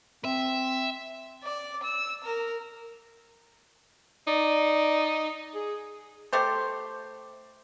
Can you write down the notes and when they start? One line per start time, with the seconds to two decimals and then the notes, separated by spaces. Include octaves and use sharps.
0.25 C4 E5
1.44 D5
1.83 E6
2.24 A#4
4.28 D#4 D5
5.55 G#4
6.33 A3 G4 C5